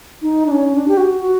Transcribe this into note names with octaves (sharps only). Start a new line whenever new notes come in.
D#4
D4
C#4
D4
G4
F#4
F#4